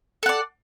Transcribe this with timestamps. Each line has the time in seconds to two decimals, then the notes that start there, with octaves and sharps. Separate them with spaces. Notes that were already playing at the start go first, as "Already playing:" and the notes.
0.23 A4
0.26 F#5
0.29 D5